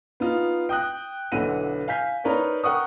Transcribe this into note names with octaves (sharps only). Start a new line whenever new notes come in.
B3 D#4 F4
G5 D#6 F#6
B1 D3 B3 E4 F#5 D#7
F5 G#5 G6 B6
D#4 A#4 B4 C#5 D5
A#4 F#5 G5 C#6 D#6